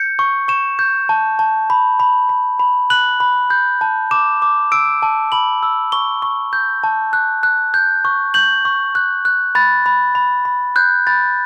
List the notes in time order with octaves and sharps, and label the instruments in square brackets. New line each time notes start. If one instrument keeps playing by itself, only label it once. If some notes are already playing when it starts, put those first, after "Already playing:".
Already playing: [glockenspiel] G6 C#7
C#6
C#6 E7
G6
A5
A5
B5
B5
B5
B5
F#6 F#7
B5
G6
A5
D6 E7
D6
E6 D7
A5
B5 F#7
E6
C#6 G7
C#6
G6
A5
F#6
F#6
G6
C#6
G6 F#7
C#6
F#6
F#6
B5 A6
B5
B5
B5
F#6 G6
B5 A6